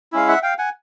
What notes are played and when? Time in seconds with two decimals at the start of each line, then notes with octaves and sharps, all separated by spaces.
0.13 G#3 C#4 E4 F5
0.28 E5 F#5
0.43 F5 G5
0.58 F#5 G#5